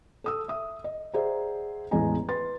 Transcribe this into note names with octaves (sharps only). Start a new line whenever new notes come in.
A4 D#6 E6
E5 D#6
D#5
G#4 C5 D5 E5 F#5 A#5
A1 E2 G#3 D#5 G#5 A#5
B4 C6 A6